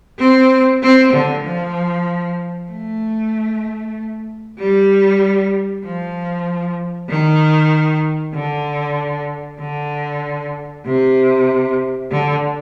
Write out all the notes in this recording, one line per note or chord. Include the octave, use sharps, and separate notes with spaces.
C4
C4
D3
F3
A3
G3
F3
D#3
D3
D3
C3
D3